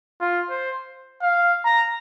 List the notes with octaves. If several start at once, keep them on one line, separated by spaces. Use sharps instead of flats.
F4
C5
F5
A#5